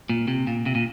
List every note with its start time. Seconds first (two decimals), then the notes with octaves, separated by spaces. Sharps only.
0.09 A#2
0.28 C3
0.47 A#2
0.66 C3
0.75 A#2